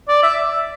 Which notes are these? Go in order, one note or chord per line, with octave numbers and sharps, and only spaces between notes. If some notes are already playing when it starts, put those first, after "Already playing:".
D5
E5